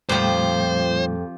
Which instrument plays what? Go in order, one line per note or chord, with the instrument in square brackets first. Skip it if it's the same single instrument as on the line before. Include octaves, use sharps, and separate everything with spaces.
[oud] F2 [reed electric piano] A#2 G3 A3 [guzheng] F3 G4 [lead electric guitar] C5